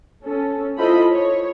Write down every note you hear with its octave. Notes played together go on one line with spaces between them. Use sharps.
C#4 A4
E4 F4 A4 C5 D#5 B5
C#5